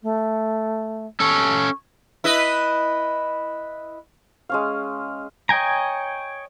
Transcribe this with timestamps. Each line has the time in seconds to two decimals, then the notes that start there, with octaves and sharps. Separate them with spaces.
0.02 A3
1.20 C#4 A4 C#6
2.24 E4 B4 D#5
4.49 G#3 C#4 F5
5.49 C#5 D#5 G5 G#5 A#5